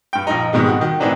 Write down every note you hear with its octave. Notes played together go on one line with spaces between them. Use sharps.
G2 G5
A#1 D#4
G#2 B2 D#3 G3 G#3
F#4
D#3
A2 D#3 E3 C4 D4 D#4